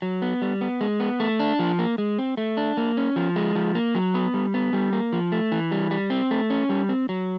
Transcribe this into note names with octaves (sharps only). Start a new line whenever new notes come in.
F#3
B3
G3
B3
G#3
B3
A3
D4
F3
A#3
G#3
C4
A3
D4
A#3
C#4
F3
G#3
F3
A#3
F#3
B3
G3
B3
G3
A#3
F3
A3
E3
G3
G3
C4
A3
C#4
G3
C4
F#3